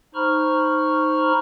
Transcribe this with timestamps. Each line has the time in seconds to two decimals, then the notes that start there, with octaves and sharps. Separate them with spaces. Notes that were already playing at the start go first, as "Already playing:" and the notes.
0.15 D#4 C5 A#5 B5 C#6 F6